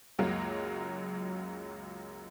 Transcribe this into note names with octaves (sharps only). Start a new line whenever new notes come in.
C#2 F#2 F#3 G#3 A#3